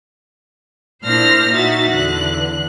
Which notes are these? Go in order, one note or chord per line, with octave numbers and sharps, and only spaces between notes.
A#2 D4 E4 C5 F6 A#6
D#4 F#4 E5 A6
E2 D3 F#6